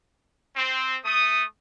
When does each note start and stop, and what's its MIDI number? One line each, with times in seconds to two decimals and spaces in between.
0.56 0.98 60
1.04 1.43 57
1.04 1.43 87